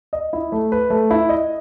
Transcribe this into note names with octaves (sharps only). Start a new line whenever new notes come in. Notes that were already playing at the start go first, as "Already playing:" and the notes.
D#5
E4
A3
B4
A3
E4
D#5